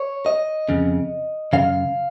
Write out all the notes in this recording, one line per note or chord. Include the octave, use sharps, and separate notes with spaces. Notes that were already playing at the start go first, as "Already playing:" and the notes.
Already playing: C#5
D#5
F2 C#3
F#2 C#3 F5